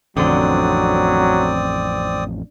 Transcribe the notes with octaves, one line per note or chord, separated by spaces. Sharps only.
A1 F2 D3 F#3 C4 D5 D#6